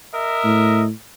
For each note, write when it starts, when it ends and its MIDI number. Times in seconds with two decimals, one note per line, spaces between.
0.14 0.85 70
0.14 0.85 75
0.14 0.85 76
0.44 0.90 45